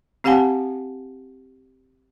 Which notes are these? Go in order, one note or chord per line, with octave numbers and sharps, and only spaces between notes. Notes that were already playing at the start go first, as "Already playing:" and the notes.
C4 G4 F5 F#5 G#5 A5